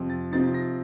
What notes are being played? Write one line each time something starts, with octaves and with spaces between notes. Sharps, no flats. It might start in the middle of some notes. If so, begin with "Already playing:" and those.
Already playing: F2 C3 F3 C4
A6
C3 F3 C4 D#4 A6
A#6